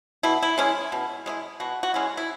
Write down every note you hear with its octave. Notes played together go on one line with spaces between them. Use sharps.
B2 E4
E4
G#3 C#4 E4
B2
G#3 C#4 E4
B2 F#4
F#4
G#3 C#4 E4
E4